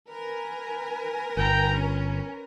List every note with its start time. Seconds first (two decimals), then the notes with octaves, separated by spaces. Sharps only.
0.10 A#4 B4 G#5
1.37 G1 G5 A#5
1.74 C#4